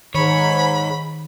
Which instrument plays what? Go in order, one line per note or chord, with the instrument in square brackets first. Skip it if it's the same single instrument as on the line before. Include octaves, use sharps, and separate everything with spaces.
[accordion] G#2 [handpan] D#3 [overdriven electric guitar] C#5 [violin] B5